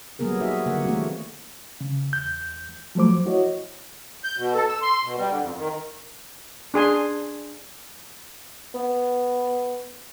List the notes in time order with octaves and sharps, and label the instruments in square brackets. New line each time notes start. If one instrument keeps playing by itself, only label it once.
[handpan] F#3 G3 A#3 B3 G#4 A#4
D#4 F#4 G#4 E5
D3 A#3 F#5
E3 G3 A3 C4 F#4
[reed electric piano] C#3
E2 G6
F3 F#3 A3 C5 D6
E4 F#4 C#5 D#5
[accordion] G6
B2
A4
E6
C6
B2
G3
D3
F2
D#3
[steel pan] D4 G#4 G#5 C6
[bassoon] B3